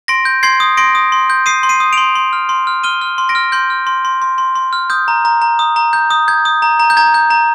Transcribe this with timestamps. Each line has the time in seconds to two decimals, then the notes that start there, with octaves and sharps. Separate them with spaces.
0.08 C6 A#6 D7
0.25 G6
0.43 C6 G#6 C7
0.60 D#6
0.77 C6 A#6 D7
0.95 D#6
1.12 C6
1.30 G6
1.46 D#6 C7 D#7
1.63 C6
1.69 C7 D#7
1.80 D#6
1.93 C6 D7 F7
2.15 C6
2.33 F6
2.49 C6
2.67 F6
2.84 F6 D#7 G7
3.01 F6
3.18 C6
3.29 A#6 D7
3.35 F6
3.52 C6 G6
3.70 F6
3.87 C6
4.05 C6
4.22 C6
4.38 C6
4.55 C6
4.73 F6
4.90 D#6 G6
5.08 A#5
5.25 A#5
5.41 A#5
5.59 D#6
5.76 A#5
5.93 G6
6.11 D#6
6.28 G6 G#6
6.45 D#6
6.62 A#5
6.79 A#5
6.90 G6
6.97 A#5 G#6
7.14 G6
7.30 A#5